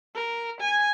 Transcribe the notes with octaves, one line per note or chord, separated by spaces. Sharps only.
A#4
G#5